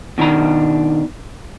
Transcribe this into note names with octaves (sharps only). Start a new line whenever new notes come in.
B2 D#3 D4 A#5